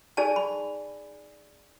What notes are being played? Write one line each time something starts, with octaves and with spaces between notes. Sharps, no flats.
D#4 G#4 D5 G#5 A5
B5